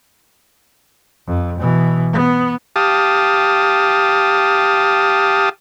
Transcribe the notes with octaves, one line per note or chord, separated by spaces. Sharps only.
F2
B2 E3
B3
G4 F5 A5 D#6